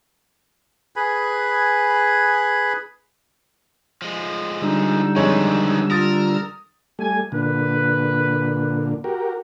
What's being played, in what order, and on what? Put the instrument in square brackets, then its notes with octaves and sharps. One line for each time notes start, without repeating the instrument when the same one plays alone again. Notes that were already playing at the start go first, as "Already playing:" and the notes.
[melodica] G#4 B4 G#5 B5
[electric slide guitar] F3 G#3
[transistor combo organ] D3 G3 E6 [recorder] D#4
[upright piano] F2 G#3 C#5 [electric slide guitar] D#3 B3
[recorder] F4 [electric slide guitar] A#4 [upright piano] D#6 A6
[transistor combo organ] G3 A3 [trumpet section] G#5
[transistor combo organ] A#2 D3 [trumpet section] B4
[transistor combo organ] F#4 G4 A#4